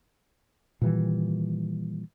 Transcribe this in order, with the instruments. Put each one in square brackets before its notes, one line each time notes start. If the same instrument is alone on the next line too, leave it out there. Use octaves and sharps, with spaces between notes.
[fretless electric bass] A#2 D#3 E3 G3